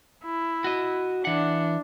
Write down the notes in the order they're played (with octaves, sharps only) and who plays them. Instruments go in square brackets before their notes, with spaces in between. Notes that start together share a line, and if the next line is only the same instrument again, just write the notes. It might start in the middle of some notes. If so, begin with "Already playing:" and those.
[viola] E4
[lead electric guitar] F#4 D#5
[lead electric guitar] E3 F#5 [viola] D4